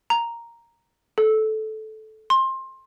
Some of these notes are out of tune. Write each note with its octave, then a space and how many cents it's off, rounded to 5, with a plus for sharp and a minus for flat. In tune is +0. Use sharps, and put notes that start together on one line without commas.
A#5 +0
A4 -15
C6 +20